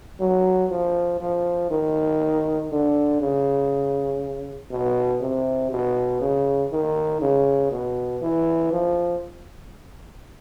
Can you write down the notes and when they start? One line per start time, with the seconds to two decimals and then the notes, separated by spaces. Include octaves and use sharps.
0.20 F#3
0.71 F3
1.20 F3
1.70 D#3
2.71 D3
3.20 C#3
4.71 B2
5.21 C3
5.71 B2
6.21 C#3
6.72 D#3
7.21 C#3
7.71 B2
8.22 E3
8.72 F3